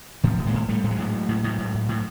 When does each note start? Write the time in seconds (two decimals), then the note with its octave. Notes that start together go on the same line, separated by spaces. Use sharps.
0.24 A2 D#3 F3
0.38 A2
0.46 G#3 A#3
0.54 A2
0.69 A2 G3 A3
0.84 A2 A3
0.91 F#3 G#3
0.99 A2
1.14 A2
1.29 A2
1.44 A2
1.59 A2
1.74 A2
1.89 A2